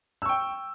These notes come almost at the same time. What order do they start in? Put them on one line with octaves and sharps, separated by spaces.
E6 C#6 G5